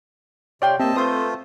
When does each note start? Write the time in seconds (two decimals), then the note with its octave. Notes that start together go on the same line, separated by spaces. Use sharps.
0.62 C3 F4 G4 C#5 D5 G5 C6
0.79 A#3 C4 G4 D#5 E5 A5
0.96 A3 F4 A4 B4 C5 C6 D#6